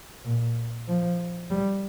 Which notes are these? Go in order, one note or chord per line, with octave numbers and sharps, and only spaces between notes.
A#2
F3
G3